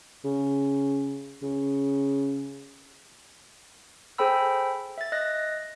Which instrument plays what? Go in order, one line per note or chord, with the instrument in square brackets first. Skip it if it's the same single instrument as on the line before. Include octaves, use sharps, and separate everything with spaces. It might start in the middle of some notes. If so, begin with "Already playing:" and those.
[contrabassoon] C#3
C#3
[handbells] G#4 A4 C5 G5 B5 E6
E5 A6
D#5 F#6 A#6